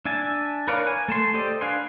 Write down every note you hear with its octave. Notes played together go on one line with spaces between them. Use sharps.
D4 E5 G#5 A5
A#4 B4 C#5 D5 F5
G#5
A3 A5 C6
G4 A4 C5 D5 D#5
D4 B4 F5 G#5 C6